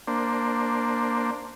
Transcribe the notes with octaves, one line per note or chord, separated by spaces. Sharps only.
A#3 D4 C5